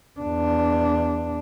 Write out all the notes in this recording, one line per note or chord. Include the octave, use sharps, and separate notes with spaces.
E2 D4